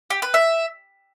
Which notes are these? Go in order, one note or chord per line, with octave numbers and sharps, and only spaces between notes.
G4
B4
E5